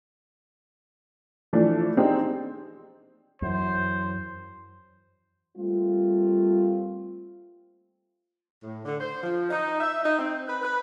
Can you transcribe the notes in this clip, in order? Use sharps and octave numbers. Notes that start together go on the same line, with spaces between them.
E3 F3 A3 D4
C4 D4 D#4 G4 G#4
F#2 E3 C5
G3 A3 A#3 C4 F4
A2
D3
C5
F3
D#4
E5
D#4
C4
B4
B4